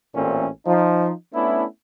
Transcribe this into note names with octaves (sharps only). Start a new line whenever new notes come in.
A1 A#2 E3 A3 C4 C#4
F3 D#4
A3 B3 C#4 D4 E4